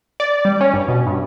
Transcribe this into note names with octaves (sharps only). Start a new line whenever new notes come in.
D5
G3
C#4
G2
B2
G2